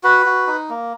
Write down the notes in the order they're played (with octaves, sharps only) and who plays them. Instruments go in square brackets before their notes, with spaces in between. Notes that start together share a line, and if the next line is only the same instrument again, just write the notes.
[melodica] F#4 B4
F#4
D#4
A#3